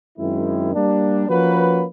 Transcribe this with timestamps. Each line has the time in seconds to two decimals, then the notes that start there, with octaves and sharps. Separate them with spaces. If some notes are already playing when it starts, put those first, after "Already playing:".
0.18 F#2 D#3 G#3 C4 E4
0.72 G3 A#3 D4
1.28 F3 A#3 C#4 F#4 B4